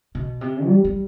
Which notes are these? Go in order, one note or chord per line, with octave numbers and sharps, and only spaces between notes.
B2
C3
G3
G3